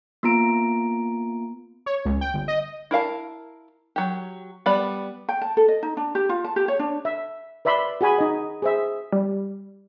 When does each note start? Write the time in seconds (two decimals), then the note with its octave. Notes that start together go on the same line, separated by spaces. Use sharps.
0.23 A#3 B3 F4 A#5 D7
1.86 C#5
2.05 C#2
2.21 G5
2.34 G1
2.48 D#5
2.91 E4 A#4 F5 A5
3.96 F#3 G4
4.66 G3 B3 B4 D5 B5
5.29 G5
5.41 A5
5.57 A4
5.68 D#5
5.83 D#4
5.97 D4
6.15 G4
6.29 F4
6.44 A5
6.56 G4
6.68 C#5
6.79 D4
7.05 E5
7.65 B4 D5 E5 B5 C6
8.01 F#4 G#4 G#5 B5
8.18 D#4 D#5
8.62 G#4 C5 E5
9.13 G3